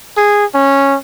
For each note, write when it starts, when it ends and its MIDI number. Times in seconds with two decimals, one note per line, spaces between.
0.17 0.45 68
0.55 0.97 61